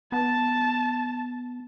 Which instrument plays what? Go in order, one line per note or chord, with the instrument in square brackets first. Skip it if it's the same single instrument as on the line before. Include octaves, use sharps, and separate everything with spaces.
[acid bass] B3 [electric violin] A5